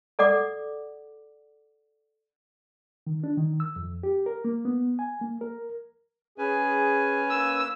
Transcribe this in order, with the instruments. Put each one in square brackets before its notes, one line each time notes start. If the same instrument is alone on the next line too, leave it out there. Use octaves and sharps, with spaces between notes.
[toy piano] A4 D5 F#5 D6
[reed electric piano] D#3
D4
D#3
E6
F2
G4
A#4
A#3
B3
G#5
A#3
A#4
[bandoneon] C#4 B4 G#5 [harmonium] G#4
[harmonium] A#3 [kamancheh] E6